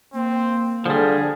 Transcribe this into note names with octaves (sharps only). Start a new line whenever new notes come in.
A#3 C4
D3 F3 G3 G#4